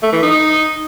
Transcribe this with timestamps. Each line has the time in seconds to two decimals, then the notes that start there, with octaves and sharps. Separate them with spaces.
0.03 A3
0.13 E3
0.23 D#4